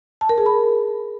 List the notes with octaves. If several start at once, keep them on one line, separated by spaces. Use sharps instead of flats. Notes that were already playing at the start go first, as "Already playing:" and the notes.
A5
A#4
G#4
B5